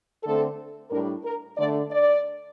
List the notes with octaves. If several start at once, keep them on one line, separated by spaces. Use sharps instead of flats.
D3 A3 C4 A4
A2 G3 D4 A#4
A#4
D3 A3 D4 D5
D5